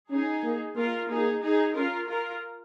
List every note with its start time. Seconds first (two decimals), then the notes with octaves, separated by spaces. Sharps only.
0.10 C#4 D#4 G#4
0.43 A#3
0.76 A#3 F4 A#4
1.09 A#3 D#4 G#4
1.42 D#4 G#4
1.75 C#4 F4 A#4
2.08 F4 A#4